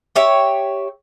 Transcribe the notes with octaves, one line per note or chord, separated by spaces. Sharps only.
G4 C#5 E5